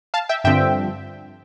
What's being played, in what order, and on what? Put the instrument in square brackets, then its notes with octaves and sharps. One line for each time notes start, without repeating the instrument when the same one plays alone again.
[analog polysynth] F5 A5
E5 G5
G2 D3 F3 C4 E5 G5